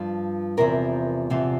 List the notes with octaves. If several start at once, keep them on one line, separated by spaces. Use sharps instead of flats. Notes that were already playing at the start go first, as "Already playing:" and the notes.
Already playing: G2 F3
E2 C3 F3 A#4
E2 C3 F3